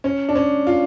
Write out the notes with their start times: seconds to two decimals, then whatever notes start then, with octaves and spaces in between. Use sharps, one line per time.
0.04 C#4
0.29 D4
0.35 C#4
0.67 F4